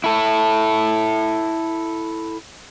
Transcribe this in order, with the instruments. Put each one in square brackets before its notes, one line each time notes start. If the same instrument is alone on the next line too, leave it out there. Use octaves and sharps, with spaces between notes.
[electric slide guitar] E4 A4